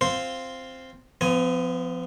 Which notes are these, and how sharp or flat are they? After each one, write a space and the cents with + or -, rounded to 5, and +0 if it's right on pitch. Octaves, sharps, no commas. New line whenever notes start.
C4 +0 F4 +0 C5 +0
F3 +0 B3 +40 G#5 +0